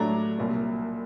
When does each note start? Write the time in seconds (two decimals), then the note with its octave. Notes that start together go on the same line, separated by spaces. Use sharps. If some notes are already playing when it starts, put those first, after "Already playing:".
Already playing: A2 F#3 A3 D4 A#5
0.38 C2 A#2 F#3